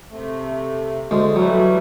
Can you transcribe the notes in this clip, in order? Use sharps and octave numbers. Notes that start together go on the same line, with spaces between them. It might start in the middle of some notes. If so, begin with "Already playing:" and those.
C3 A3
D2 G#3
E3 F#3 G3 A3